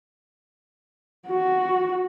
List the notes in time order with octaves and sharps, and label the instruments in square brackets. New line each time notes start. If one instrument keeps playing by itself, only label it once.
[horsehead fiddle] F#4